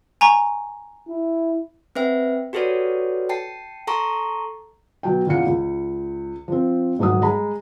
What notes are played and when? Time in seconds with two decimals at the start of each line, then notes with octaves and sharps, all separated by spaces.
0.21 G#5 A#5 C#6
1.09 E4
1.95 C4 B4 E5 G5
2.53 F#4 G4 A4 B4 C#5 D5
3.29 G5 A5 C7
3.87 A4 A5 A#5 C6 C#6
5.03 B2 F#3 G5
5.26 E2 A#2 C#3 F5 F#5 C#7
5.46 C#2
6.48 F3 C4
6.99 D#1 G#2 F#3 F#5 D#6
7.22 G#3 A#5 B5